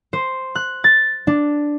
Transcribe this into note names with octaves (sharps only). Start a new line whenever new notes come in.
C5
F#6
A6
D4